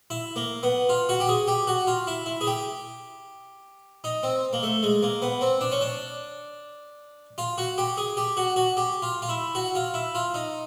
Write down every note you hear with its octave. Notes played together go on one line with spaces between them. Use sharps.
E4
A#3
B3
F4
F#4
G4
G#4
G4
F#4
F4
E4
E4
G#4
G4
D#4
C4
A#3
A3
G#3
A#3
B3
C4
D4
C#4
D4
F4
F#4
G4
G#4
G4
F#4
F#4
G4
F4
F4
E4
F#4
F4
E4
F4
D#4